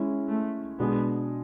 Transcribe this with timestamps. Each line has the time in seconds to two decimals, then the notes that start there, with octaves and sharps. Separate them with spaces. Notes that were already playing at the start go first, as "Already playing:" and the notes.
Already playing: G#3 C#4 E4
0.28 A3
0.79 B2 G#3 B3 D4 G#4